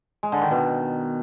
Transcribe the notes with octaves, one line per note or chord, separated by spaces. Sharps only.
G#3
D3
D#3
B2